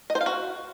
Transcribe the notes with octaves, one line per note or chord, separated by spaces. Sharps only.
D#5
C5
F5
F#4